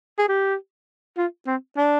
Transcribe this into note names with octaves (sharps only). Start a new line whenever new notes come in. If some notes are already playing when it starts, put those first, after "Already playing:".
G#4
G4
F4
C4
D4